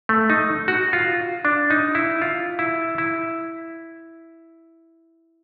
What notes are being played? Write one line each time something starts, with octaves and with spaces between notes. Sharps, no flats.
A3
D#4
F#4
F4
D4
D#4
E4
F4
E4
E4